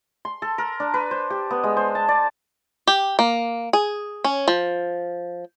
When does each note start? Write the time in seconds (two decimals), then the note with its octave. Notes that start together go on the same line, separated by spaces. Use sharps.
0.25 C6
0.42 A4
0.58 A#4
0.80 D4
0.94 B4
1.11 C5
1.30 G4
1.51 B3
1.63 G#3
1.77 C5
1.95 A5
2.09 D5
2.87 G4
3.19 A#3
3.73 G#4
4.24 C#4
4.48 F3